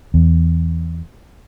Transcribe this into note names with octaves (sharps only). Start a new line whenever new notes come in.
E2